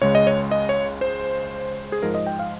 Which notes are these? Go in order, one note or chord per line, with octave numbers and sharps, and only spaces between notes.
C#2 C#3 G#3 C#5
D#5
C#5
D#5
C#5
C5
G#4
G#2 F3 G#3 A#4
D#5
G5
F5